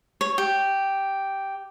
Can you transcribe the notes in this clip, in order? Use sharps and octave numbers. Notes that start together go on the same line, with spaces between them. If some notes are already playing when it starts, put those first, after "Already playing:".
C#5
G4